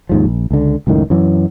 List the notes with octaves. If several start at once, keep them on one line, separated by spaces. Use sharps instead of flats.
D#2 G#2 F3
A#1
C#2 D3
C#2 F#2 A2 D#3
F#2 E3 F#3